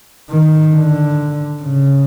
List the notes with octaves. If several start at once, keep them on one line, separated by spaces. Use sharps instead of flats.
D#3
D3
C#3